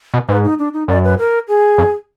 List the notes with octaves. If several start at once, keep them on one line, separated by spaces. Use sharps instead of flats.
B2
G#2 B4
D#4
D4
D#4
F#2 D5
B4
A#4
G#4
F2